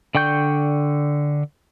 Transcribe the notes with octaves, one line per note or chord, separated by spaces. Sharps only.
D3 D5 G5 C#6 G6